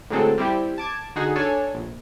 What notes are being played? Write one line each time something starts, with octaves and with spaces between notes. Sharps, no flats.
A2 D3 F#3 G#3 C4 A4
G3 C4 E4 G4
A5 D6 G#6
D3 D#4 F#4 G#4
D4 A4 C#5 G#5
A#1